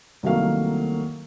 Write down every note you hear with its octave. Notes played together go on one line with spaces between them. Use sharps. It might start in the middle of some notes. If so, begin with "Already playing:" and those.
C2 D#3 F#3 A3 A#3 F5